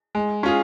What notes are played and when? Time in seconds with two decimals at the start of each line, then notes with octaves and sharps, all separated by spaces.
0.15 G#3
0.43 C#4 F4 G#4